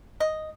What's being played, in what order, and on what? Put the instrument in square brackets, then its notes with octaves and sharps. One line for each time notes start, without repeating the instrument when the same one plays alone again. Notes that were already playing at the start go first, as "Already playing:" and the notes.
[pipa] D#5